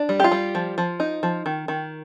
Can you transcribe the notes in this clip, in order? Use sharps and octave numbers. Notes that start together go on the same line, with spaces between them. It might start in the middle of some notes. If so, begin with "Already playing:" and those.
Already playing: D4
G3
G4
F4
G3
F3
F3
D#4
F3
D#3
D#3